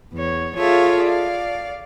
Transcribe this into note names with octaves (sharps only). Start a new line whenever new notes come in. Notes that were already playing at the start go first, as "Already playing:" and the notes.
E2 C#5
F4 G#4 A4 C#5 E5 F5
D5 F5